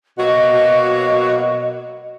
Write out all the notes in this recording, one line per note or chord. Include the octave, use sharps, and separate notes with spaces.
B2 F#3 A#3 F#4 D#5